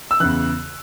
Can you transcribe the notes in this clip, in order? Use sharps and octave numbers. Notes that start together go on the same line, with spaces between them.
E6
E2 C#3 E3 F#6